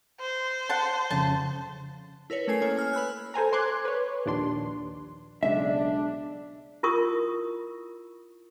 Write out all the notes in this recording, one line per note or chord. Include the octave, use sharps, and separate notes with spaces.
C5
F#5 A5 C6
F2 C#3 A5
E4 A#4 B4 C#5
A3 C#4 A4 G#5 C7
A#3 C#4 C#5
G#5 F6
B4 B5 E6 F#6
A4 C5 G#5 A#5
C5 C6 D6 F#6 G#6
B4 C#5
A#1 D#2 D4 C6
B1 C#3 G#3 D4 E5
E4 F4 A#4 C#6 D#6